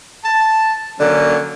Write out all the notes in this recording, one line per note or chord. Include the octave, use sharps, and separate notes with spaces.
A5
D3 F#3 A#3 C#4